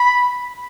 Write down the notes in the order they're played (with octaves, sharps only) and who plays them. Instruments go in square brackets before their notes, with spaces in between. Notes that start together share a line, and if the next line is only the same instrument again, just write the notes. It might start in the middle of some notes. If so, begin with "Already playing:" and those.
Already playing: [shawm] B5